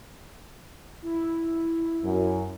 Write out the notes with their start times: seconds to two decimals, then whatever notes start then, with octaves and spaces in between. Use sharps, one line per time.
1.02 E4
2.03 F#2